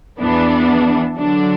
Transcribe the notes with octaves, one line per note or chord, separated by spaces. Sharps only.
E2 E3 B3 D4
D3 F#3 D4